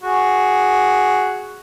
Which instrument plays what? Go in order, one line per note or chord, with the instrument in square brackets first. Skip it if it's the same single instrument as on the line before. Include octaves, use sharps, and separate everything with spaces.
[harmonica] F#4 G#4